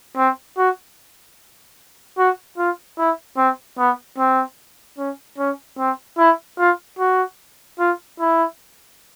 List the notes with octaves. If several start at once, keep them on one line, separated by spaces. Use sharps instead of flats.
C4
F#4
F#4
F4
E4
C4
B3
C4
C#4
C#4
C4
E4
F4
F#4
F4
E4